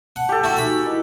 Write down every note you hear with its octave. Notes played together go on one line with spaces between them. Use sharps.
F#5 A5
G4 A4
E4 F#4
D#4 F#4 F#5 G#5 B5
E4 A#4 B4 D#5